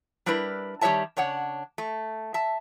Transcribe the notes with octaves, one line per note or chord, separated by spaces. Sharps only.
G3 D4 E4 A#4 B4
D#3 G3 A4 C#5 E5 A5
C#3 D4 C#5 F#5
A3
E5 A5